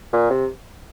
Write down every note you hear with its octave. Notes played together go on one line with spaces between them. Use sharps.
A#2
C3